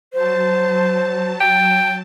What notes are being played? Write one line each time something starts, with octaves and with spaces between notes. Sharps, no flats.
F#3 C5 A5
G5